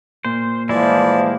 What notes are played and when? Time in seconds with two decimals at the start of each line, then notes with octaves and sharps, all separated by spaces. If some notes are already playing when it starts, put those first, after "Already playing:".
0.25 A#2 C5
0.69 E3 F3 G3 G#3 E4 D5